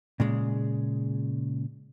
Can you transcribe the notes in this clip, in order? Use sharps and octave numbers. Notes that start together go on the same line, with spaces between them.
A#2 C#3 G#3